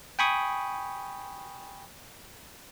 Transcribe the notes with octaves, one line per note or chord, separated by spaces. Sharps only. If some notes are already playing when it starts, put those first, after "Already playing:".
G5 G#5 B5 C#6 D#6